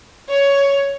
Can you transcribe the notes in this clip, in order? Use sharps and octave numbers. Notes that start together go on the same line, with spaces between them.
C#5